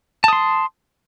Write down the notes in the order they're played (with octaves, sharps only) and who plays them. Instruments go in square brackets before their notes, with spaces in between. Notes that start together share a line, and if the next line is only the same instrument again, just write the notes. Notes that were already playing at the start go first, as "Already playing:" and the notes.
[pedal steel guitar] A5
D#6
C6